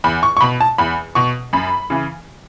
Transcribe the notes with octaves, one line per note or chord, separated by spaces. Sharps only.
E2 B5
C#6
C#6
B2 B5
A5
E2 B5
B2 C#6
F#2 B5
C#3 E3